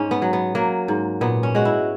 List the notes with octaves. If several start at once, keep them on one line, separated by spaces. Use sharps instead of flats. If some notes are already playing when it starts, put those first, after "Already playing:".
Already playing: G#2 C#4
B3
F#3
B3
F#3 A#3
G#2
A#2 B3
C#4
G#3 F#4
E4